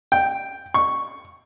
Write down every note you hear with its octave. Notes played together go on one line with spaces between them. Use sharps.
G5
C#6